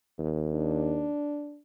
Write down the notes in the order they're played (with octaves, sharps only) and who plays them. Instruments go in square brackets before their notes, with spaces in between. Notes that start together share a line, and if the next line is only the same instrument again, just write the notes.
[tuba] D#2
[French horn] D4